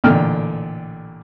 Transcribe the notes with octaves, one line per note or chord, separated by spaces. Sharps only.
A1 A#2 D3 G5 F6